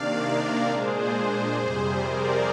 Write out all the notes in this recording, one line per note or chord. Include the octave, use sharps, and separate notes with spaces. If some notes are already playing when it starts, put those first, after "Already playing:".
Already playing: C3 D#3 A#3 D4 D5 F5
A#4 D5
A#2 G#3 D4 G#4 C5
G#4 C5
F2 C3 G3
A#4 D5